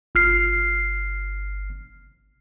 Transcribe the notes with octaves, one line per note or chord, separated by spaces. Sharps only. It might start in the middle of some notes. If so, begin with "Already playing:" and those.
G1 F6 C7